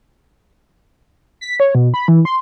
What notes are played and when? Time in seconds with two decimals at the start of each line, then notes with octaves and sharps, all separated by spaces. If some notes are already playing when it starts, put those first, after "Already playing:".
1.41 B6
1.60 C#5
1.75 B2
1.94 B5
2.08 E3
2.25 C6